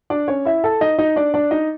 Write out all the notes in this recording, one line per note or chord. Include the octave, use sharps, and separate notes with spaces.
D4 D5
C#4 C#5
E4 E5
A4 A5
D#4 D#5
D#4 D#5
D4 D5
D4 D5
D#4 D#5